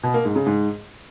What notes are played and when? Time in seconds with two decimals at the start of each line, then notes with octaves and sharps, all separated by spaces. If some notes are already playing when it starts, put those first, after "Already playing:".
0.03 B2
0.14 A#3
0.25 G#2
0.36 C#3
0.46 G#2